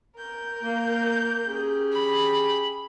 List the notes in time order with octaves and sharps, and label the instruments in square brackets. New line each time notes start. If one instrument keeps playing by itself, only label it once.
[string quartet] A#4 G6
[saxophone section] A#3
C#4 G4 G#4
[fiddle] B5